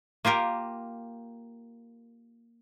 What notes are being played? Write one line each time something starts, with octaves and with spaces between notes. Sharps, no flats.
A#3 F4 G4 A#4